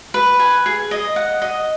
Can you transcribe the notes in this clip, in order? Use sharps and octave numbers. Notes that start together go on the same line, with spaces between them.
B4
G#5
G#4
D#5
F#5
D#5